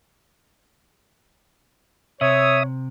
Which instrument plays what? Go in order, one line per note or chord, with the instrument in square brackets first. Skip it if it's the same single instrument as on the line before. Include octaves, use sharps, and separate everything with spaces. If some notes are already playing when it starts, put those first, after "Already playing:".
[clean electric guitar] C3 [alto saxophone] C#5 [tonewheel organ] E5 D#6